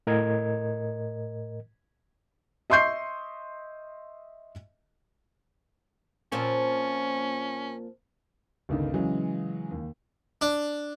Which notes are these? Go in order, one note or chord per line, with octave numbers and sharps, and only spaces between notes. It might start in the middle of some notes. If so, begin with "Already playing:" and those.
A2 A#4 D#5 G#6
D#5 E5 C6 C#6 G6 C7
A#2 F3 C4 C#4
G1 C#2 D#3
C#3 E3 F#3 G#3
D#2
D4